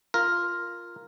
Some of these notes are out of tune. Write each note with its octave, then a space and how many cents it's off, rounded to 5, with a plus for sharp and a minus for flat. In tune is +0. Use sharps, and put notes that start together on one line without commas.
F4 +0 A#4 +0